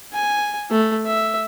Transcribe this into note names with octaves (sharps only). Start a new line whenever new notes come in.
G#5
A3
E5